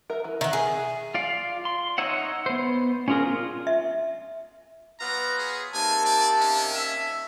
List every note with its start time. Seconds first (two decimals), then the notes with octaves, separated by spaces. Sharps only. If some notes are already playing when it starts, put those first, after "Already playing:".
0.10 A#4 E5
0.24 E3
0.41 D#3 E5 F#5
0.53 G#4
1.14 F4 D5 F5
1.65 C6
1.98 D#4 C#5 E5 F#5
2.46 B3 C5
3.08 C#4 D4 F4 G#4 A#4
3.27 F4
3.67 E5
5.00 F#3 B3 F4 A#5
5.38 G#4
5.74 C3 A#3 D#4 G#5 A5
6.05 D5
6.41 C#4
6.76 E5